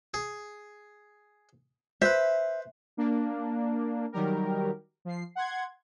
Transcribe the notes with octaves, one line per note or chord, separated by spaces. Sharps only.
G#4
B4 C5 E5
A#3 D4
D#3 F#3 G3 G4 A#4
F3 C7
F#5 C6 G#6